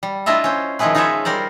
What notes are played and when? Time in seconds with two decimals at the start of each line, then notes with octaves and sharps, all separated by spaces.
0.03 G3
0.26 D4 E4 F4 D#5 E5
0.44 C#4 C5
0.79 D#3 F3 G#3 E4 G#4 B4
0.95 D#4 F4 G#4 B4 C#5 E5
1.25 G3 A#4 C5 D5